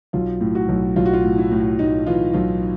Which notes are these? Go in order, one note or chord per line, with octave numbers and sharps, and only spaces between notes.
B1 F4
A2
F#4
B1
B1 F4
F#4
F4
A2
E4
A2
A2 D#4
E3 F4
B1 F4